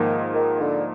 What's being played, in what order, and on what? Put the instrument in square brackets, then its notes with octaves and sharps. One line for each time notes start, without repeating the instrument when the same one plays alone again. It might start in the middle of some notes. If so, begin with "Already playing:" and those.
Already playing: [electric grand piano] G#2 F3 A#3 D#4 [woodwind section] D#3
[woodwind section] D#3
D3